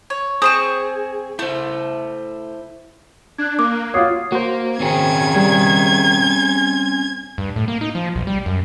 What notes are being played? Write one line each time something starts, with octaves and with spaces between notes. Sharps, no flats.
C#5
C4 G#4 C6 C#6 D#6 E7
A3 E4 C5
D4 F#6 G#6
A#3 D6
F4 F#4 C#5 D#6 G#6 C7
A#3 F#4 C5
D#3 C4 C#4 G#4 G#6
G3
G2
A2
A#3
D#4
F3
B1
G3
F#2